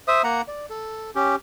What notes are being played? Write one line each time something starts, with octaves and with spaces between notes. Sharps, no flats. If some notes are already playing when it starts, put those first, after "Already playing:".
C5 E5 D#6
A#3 F#5 A#5
D5
A4
C#4 G4